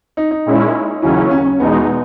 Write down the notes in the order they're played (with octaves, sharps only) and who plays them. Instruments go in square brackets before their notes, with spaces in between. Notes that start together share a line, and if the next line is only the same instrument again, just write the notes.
[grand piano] D#4
D#4
[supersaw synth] A#2 G#3 C#4 E4
[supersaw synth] D#2 C#3 F#3 C#4 [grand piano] E4
[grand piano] E4
C#4
C#4
[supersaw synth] E2 B2 G#3 D#4 [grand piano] B3